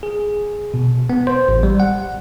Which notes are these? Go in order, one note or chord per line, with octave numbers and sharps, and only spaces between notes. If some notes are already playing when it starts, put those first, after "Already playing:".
G#4
B2
B3
C5
A1
G3
F#5